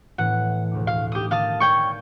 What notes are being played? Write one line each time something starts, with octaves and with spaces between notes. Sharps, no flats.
A2 E3 B3 F#5
E1 D2 D6
F5
D#4 G4 D#6
D#3 F5 A5 D#6
C#5 D5 G5 C#6 F6